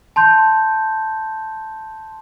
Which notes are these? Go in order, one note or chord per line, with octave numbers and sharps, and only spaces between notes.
A5 C6 G6